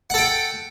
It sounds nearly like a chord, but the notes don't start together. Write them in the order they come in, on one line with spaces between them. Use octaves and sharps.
F#5 A4 G5